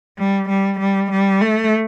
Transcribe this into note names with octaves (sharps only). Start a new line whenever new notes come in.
G3
G3
G3
G3
A3